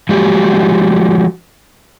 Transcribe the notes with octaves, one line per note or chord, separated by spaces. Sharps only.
F3 G#3 A3 F#4 G4